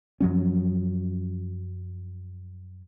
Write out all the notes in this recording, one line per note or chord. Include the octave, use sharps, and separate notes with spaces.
F#2 F3 F#3 C#4